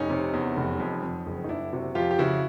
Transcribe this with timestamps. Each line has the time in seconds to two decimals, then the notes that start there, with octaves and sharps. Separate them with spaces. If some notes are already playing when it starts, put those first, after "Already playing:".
Already playing: F1 C#4 D#4
0.10 C3
0.34 E2
0.57 F1
0.80 F2
1.03 F2
1.27 F#1
1.44 D#4
1.49 F#1 D4 E4
1.73 C3 E4 F#4
1.95 F2 F4 G4
2.11 G4
2.19 C#3 E4 F#4